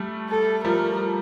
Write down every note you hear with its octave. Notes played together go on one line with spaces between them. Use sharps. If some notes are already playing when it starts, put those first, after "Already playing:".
Already playing: G3 A3
A4
F3 G3 A#4